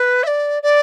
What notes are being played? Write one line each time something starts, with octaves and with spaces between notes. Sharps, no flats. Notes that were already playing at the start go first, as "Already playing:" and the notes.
Already playing: B4
E5
D5
D5